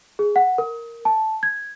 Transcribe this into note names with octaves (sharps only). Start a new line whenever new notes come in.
G#4
F#5
A#4
A5
G#6